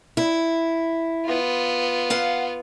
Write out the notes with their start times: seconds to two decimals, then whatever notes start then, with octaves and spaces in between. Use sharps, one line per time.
0.17 E4
1.25 B3 F4
2.10 F5 F#5